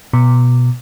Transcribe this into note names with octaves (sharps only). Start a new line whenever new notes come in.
B2